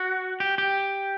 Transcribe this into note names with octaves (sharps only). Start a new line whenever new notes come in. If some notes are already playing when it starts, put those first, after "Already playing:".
Already playing: F#4
G4
G4